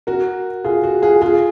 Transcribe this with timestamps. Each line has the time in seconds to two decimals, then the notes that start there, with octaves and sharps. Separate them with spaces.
0.07 F#4 A#4
0.64 F4 G#4
0.84 F#4
1.02 F4 G#4
1.21 F4 G#4